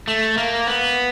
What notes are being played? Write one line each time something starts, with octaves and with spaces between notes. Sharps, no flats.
A3
A#3
B3